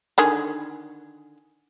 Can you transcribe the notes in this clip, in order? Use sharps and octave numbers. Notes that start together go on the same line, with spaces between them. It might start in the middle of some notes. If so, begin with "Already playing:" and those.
D3 D#3 G#4